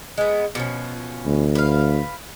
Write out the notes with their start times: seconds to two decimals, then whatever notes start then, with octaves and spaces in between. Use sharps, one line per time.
0.18 G#3 B3
0.55 B2 F3 C#4
1.26 D2
1.55 B4 F5